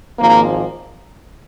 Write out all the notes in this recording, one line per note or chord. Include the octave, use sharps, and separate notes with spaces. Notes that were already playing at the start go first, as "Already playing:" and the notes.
G#1 G#2 F3 A#3